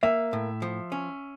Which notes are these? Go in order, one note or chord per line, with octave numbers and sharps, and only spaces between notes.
A#3 E5
A2
F3
C#4